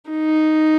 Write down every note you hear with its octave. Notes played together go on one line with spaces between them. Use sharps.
D#4